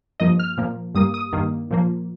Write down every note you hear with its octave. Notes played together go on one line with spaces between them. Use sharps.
G2 F3 A#3 D#5
F6
A#2 F3 A#3
G2 G3 A#3 D#6
D#6
G2 D#3 A#3
A#2 F3 A#3